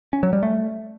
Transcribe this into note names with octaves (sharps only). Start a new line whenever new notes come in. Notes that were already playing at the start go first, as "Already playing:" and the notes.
C#4
F#3
G3
A3